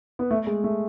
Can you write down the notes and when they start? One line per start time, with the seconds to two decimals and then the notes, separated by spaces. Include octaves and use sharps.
0.19 B3
0.31 A3
0.47 G#3
0.64 A3